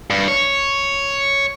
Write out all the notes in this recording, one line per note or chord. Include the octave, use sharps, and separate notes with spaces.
G2
C#5